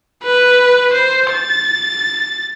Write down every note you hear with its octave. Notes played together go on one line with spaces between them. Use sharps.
B4
C5
A6